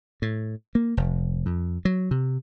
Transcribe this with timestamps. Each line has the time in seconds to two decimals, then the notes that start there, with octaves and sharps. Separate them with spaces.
0.22 A2
0.75 A#3
0.97 F1
1.46 F2
1.85 F#3
2.11 C3